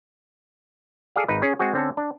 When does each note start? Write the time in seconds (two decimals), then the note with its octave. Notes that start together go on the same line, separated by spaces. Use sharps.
1.16 G#4 A4 D5 F5
1.28 G#1 D#4 B4
1.42 C#4 G#4 C#5
1.59 G#3 C4 F#4 G#4
1.73 D3 C4 C#4 A4
1.97 D4